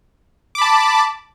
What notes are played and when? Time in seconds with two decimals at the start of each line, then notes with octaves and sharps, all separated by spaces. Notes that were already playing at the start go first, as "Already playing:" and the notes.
0.55 D6
0.58 B5
0.61 A5